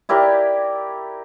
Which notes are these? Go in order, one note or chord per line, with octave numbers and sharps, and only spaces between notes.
E4 G4 A#4 D5